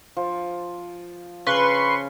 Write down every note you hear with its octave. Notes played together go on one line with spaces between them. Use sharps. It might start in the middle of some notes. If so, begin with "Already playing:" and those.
F3
C#3 B4 C6 C#6